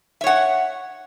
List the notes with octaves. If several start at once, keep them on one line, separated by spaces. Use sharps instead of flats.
C#5 E5 F#5